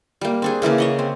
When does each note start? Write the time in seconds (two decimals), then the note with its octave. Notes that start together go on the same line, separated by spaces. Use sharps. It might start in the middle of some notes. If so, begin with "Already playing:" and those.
0.21 G3 A#3
0.42 C4 D4 G#4
0.62 C#3 E3 A#3 C#4
0.78 C#5 D#5 F#5
0.99 C4